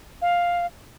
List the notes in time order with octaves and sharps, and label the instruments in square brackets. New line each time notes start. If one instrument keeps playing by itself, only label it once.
[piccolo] F5